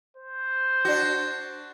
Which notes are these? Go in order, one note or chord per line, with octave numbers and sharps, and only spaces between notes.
C5
D4 F#4